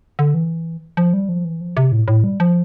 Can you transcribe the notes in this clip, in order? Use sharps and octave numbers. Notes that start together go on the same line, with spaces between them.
D3
E3
F3
G3
F3
E3
F3
C3
A2
A2
G3
F3